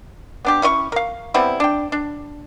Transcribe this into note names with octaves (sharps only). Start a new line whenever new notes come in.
B3 D4 G4
C#4 E4 C#5 C#6
A#4 F5
G3 B3 C4 E4
D4 G5
D4